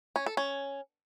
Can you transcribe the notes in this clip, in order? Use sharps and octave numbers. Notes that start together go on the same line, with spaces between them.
C#4
A4
C#4